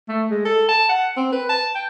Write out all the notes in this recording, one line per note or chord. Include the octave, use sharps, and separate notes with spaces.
A3
G#3
A4
A5
F#5
C4
B4
A5
G5